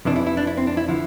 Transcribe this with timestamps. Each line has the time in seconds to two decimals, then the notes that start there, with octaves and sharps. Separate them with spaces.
0.05 F2 C3 E3 D4
0.16 E4
0.26 E4
0.37 D4
0.47 E4
0.57 C4
0.67 D4
0.77 E4
0.88 D3 F3 E4